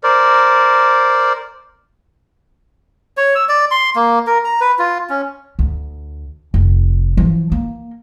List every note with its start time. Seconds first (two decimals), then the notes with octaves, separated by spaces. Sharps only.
0.03 A#4 C5 D5
3.17 C#5
3.35 E6
3.49 D5
3.71 C6
3.96 A#3
4.27 A#4
4.45 A#5
4.61 B4
4.79 F4
5.10 C#4
5.59 D2
6.54 F1
7.17 E3 F3
7.52 A#3